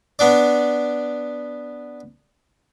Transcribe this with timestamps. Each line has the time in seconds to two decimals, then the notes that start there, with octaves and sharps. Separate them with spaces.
0.19 B3 D4 D5